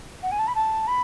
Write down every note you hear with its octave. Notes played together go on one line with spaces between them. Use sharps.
F#5
G#5
A5
B5
A5
B5